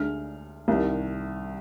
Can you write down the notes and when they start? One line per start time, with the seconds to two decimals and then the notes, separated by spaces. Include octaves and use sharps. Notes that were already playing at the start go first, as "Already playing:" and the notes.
Already playing: D2 D3 G#3 F6
0.68 C2 C3 D#3